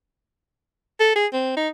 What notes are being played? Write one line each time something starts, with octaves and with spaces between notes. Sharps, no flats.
A4
G#4
C4
D#4